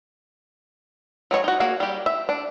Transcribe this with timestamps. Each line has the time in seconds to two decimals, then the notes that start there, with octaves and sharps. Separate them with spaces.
1.31 F#3 G#4 C#5 D#5
1.44 D#4 F#4
1.60 A#3 F#4 G#4
1.80 G3 G4
2.06 E5
2.29 D4